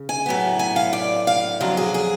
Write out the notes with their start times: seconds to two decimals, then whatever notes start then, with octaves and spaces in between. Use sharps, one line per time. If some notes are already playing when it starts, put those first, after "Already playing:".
Already playing: C#3
0.09 G#5
0.26 A2 F#3 B3
0.59 G#5
0.76 F5
0.93 D5
1.27 F5
1.61 F2 D3 F#3 F5
1.77 G#4
1.94 G#4